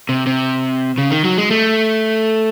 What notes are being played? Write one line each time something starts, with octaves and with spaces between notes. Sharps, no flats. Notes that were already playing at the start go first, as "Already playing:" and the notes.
C3
C3
C#3
D#3
F#3
G#3
A3